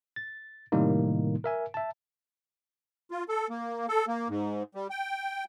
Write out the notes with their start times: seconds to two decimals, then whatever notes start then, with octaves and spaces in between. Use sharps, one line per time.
0.16 A6
0.72 A2 C3 D#3 G3 A#3 D#4
1.44 A#4 E5 G#5
1.74 E5 A5
3.11 F4
3.29 A4
3.50 A#3
3.89 A4
4.08 A#3
4.29 G#2
4.75 G3
4.90 G5